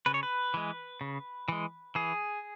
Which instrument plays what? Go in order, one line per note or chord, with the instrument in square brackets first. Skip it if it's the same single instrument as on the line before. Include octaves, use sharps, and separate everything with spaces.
[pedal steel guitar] C#3 B4
C#5
B4
E3 G#3
C#3
E3 G#3
E3 G#4